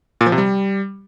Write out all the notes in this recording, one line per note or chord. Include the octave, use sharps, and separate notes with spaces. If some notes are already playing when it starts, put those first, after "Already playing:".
A#2
F3
C3
G3